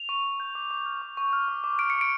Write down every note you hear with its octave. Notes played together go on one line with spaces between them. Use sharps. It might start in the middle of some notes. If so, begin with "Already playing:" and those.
Already playing: F7
C#6
C#6
G6
D6
D6
F6
C#6
C#6
F6
D6
D6
F6 D7
C#7
D6
D7